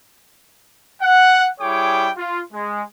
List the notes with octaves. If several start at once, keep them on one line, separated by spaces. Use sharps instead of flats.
F#5
G3 E4 G#4 C#5 G5 D6
F4
G#3